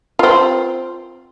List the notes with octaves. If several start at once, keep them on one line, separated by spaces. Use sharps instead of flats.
C4 F4